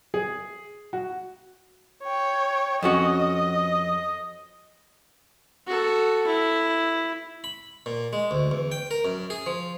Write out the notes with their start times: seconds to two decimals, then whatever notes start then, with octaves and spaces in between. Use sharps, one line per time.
0.14 G#4
0.93 F#4
2.04 C#5 G5
2.82 F2 C#4 F#4 D#5
5.67 F#4 A4
6.27 E4
7.44 B5
7.86 A#2
8.13 G#3
8.31 D2
8.51 E2
8.72 G5
8.91 A#4
9.05 F#2
9.30 G#4
9.46 F3